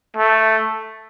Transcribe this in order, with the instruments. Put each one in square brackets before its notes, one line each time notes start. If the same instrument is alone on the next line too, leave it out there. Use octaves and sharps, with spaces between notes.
[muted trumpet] A3